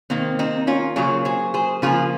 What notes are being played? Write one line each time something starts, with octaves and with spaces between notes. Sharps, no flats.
C3 D#3 A#3 C4
C4 D#4
C#4 F4
C#3 F#3 A#3 F4 G#4
G#4 C5
G#4 C5
C#3 F3 A#3 F4 G#4